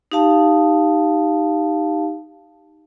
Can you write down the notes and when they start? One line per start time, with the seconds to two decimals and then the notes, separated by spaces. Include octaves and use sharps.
0.12 D#4 G4 F5 A5